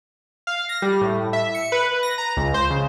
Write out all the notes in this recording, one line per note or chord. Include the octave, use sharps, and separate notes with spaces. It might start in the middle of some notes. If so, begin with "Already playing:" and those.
F5
A#6
G3
A2
E5
C#7
B4
A#6
A#5
C#2
C5
C#3